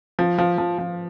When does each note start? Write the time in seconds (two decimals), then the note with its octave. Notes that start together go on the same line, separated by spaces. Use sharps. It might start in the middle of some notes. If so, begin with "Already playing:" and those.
0.19 F3
0.38 F3
0.58 F3
0.78 F3